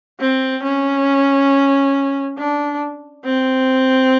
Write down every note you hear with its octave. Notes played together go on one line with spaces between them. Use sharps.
C4
C#4
D4
C4